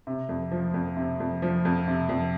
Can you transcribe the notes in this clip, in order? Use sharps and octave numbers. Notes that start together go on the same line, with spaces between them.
C3
F2
F3
F2
C3
F2
F3
F2
C3
F2